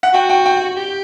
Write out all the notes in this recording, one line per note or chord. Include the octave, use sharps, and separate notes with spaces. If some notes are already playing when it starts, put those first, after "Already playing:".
F#5
F#4 G5
G5
G5
G4